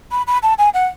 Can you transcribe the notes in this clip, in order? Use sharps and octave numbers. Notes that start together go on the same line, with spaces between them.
B5
B5
A5
G#5
F#5